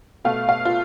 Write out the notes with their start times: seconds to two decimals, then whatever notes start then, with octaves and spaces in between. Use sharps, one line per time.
0.24 B2 A3 F5
0.49 F5
0.65 F4